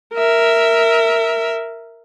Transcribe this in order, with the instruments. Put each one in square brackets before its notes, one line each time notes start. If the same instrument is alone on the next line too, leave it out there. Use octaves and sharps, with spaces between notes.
[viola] A#4 E5